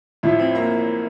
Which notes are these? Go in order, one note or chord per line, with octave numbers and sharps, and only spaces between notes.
A1 A2 F3 E4
C4
A#3